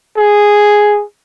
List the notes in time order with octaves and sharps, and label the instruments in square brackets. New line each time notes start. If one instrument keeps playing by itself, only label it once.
[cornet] G#4